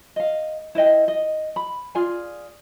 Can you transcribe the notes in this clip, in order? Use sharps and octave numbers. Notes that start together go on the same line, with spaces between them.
D#5 F5
E4 B4 D#5 G5
D#5
B5
F4 G#4 D5 G#5